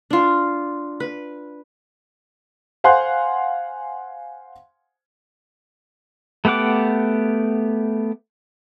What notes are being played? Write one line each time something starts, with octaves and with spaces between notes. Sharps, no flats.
D4 F4
B4
C5 F5 F#5 G#5 C6 F#6
A3 B3 G4 F#5 D6